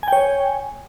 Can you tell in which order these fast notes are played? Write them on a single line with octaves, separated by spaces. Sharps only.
G#5 G5 C#5